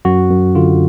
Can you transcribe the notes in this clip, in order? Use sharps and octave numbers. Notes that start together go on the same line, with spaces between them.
F#2 F#4
F#2
D3 F4